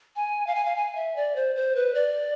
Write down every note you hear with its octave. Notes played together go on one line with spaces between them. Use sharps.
G#5
F5
G#5
F5
G#5
E5
D5
C5
C5
B4
D5